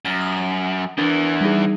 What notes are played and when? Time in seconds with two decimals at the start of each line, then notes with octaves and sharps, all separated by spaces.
0.05 F#2 A6
0.21 D#6
0.98 E2 E3 D4 A#4
1.41 G3 D#4 G#4